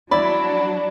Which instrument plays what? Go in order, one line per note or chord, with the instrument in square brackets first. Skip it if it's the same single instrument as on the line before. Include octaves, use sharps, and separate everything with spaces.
[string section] F#3 D4 [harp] E4 D5 [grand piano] B5